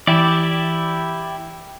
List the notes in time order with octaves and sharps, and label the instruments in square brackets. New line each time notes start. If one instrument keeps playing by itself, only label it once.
[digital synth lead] E3 [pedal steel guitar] E4 G4 D5